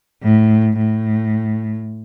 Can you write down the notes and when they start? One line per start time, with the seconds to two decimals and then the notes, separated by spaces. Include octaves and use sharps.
0.23 A2
0.78 A2